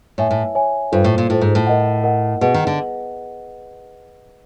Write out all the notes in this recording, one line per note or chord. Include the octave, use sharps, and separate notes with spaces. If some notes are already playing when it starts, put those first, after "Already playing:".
A2 C#5 E5 G#5
A2
C#5 E5 G#5
G2 F4 A4 C5
A2
A#2
A2 F4 A4 C5
G#2
A2
A#4 D#5 F#5
A#4 D#5 F#5
B2 G#4 B4 D#5 F#5
D#3
D3